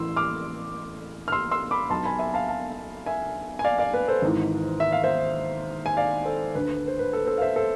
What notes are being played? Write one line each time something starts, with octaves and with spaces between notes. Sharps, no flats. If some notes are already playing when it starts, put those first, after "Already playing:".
Already playing: A1 A2 E3 C6 E6
D6 F6
F6
C6 E6
C6 E6
B5 D6
B1 B2 A5 C6
G#5 B5
E5 G#5
F5 A5
F5 A5
E5 G#5
G#5
D5 F5
D5 F5
B4
A4 C5
G#1 G#2 E3
E5
F5
C5 E5
G#5
D5 F5
A4 C5
D2 D3 B4
C5
B4
A4
A4 C5
F5
C5 E5
A4 C5